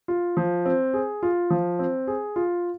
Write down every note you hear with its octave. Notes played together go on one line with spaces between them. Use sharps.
F4
F3
C4
G#4
F4
F3
C4
G#4
F4